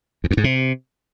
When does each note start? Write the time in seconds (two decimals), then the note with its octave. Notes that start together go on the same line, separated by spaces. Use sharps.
0.24 E2
0.31 F2
0.37 G#2
0.44 C3